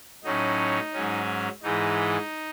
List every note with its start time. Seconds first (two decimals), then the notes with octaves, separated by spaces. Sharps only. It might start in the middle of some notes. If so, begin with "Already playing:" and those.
0.24 A2 F#3 C#4 D#4
0.94 G#2 F#3 C#4
1.63 G#2 E3 G#3 D#4